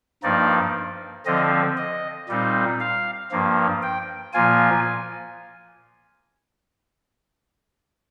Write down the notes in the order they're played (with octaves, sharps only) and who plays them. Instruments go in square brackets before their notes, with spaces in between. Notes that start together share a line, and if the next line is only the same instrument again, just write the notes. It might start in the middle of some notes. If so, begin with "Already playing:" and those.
[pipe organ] G2 F3 A#3 D#4 D5
D3 F3 C4 D#5
D#5
A#2 G3 C4 D#4
F5
G2 F3 A#3
G5
A#2 F3 A#3 F4 G#5